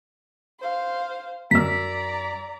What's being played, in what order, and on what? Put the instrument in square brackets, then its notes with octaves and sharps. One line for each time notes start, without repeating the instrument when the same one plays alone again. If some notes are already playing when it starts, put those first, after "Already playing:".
[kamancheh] C5 F5
[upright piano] F#2 E6 [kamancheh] D5 A#5 [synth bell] B6